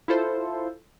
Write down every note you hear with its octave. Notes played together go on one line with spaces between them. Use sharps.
E4 F4 A4 C5